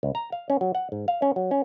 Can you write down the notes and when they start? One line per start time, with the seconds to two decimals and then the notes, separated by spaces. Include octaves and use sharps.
0.03 C#2
0.15 A#5
0.32 F5
0.50 C#4
0.61 F#3
0.75 F#5
0.92 G#2
1.08 F5
1.22 C#4
1.36 F#3
1.51 C#4